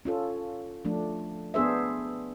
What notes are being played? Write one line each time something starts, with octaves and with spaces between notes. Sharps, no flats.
C#4 F4 A4
F3 A3 D4
B3 D4 G#4 C5 E5